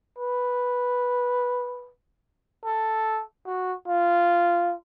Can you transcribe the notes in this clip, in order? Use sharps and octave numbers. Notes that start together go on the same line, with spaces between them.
B4
A4
F#4
F4